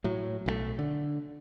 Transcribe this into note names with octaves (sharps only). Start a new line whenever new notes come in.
A2 F#3
B1 D#3 A3
D3